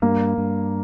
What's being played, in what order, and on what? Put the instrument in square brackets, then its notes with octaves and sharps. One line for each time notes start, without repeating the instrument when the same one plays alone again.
[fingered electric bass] G2 [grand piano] A#3
[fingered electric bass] G2